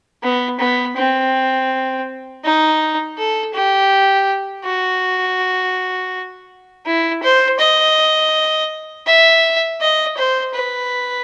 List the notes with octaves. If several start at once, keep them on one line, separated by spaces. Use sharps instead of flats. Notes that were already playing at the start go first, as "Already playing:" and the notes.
B3
B3
C4
D#4
A4
G4
F#4
E4
C5
D#5
E5
D#5
C5
B4